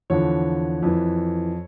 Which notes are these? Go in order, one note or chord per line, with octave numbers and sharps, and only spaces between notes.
E2 D3 F3 C#5
F2 E3